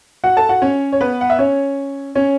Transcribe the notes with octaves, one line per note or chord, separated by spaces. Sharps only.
F#4 F#5
A4 A5
F#4 F#5
C#4 C#5
C#5
B3 B4
F#5
E5
C#4 C#5
C#4 C#5